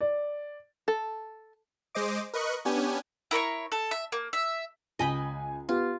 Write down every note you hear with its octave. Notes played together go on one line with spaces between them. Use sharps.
D5
A4
G#3 C5 D#5 D6
A#4 B4 D#5 C#6 F#6
B3 C#4 D4 G4 G#5
E4 A#4 C#5 C#6
A4
E5
A#3
E5
C#2 D#5 G5 G#5 B5
B3 F4 G4